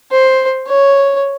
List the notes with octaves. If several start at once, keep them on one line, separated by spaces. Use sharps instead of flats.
C5
C#5